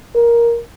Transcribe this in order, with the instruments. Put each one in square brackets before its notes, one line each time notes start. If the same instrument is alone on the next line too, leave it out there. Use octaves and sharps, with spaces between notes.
[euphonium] A#4